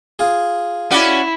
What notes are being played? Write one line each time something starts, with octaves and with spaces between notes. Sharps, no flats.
F4 G#4
C#4 E4 F#4 D5